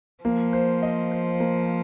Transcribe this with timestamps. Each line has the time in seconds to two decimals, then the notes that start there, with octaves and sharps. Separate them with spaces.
0.24 F3 A#3
0.53 C5
0.83 D#5
1.12 C5
1.40 A#3